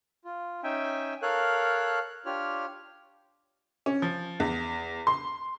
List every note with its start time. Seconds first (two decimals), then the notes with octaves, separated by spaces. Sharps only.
0.25 F4
0.63 C#4 D#4 E5 G5 G#5
1.22 A4 A#4 C#5 F5 F#6
2.26 D4 F4 G4 C#5 F6
3.86 C#4
4.02 F3
4.40 E2
5.07 C6